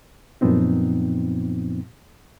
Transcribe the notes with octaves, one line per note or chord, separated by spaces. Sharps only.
F#2 A#2 F3 B3 C4 D#4